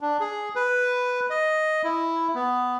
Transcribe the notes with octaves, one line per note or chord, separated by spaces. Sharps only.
D4
G#4
B4
D#5
E4
B3